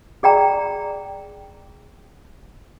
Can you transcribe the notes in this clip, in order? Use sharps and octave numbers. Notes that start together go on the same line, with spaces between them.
G#4 D5 G5 A#5